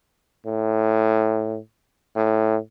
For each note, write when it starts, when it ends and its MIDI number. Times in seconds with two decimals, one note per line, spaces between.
0.46 1.57 45
2.16 2.56 45